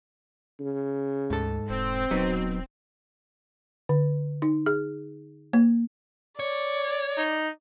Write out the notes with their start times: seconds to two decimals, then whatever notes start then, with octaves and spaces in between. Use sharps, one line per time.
0.60 C#3
1.30 D2 G#2 A4
1.70 E1 C4
2.11 D#1 B2 F#3 B3 D#4
3.89 D3
4.42 D#4
4.66 G#4
5.53 A#3
6.40 C#5 D5
7.17 D#4